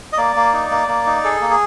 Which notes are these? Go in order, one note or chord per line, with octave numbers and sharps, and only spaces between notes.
D#5
A#3 D5
A#3
D#4
A#3
A#3
D#4
G#4 A4
A#3
G#4